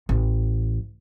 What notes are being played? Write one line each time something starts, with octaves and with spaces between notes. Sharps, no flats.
A1